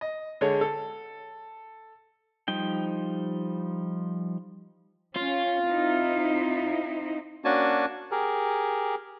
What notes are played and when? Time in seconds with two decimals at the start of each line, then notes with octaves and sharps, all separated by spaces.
0.01 D#5
0.41 D3 G#3 C#5
0.61 A4
2.48 F3 G3 D#4 G5
5.16 C#4 F4
5.67 C4 D#4 E4
7.45 A#3 C#4 D4 F#4 G#5 A5
8.11 G4 G#4 A#4